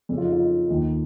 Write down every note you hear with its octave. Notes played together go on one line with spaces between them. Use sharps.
F2 C#3
F4
D#4
F4
D#4
D#2 D#3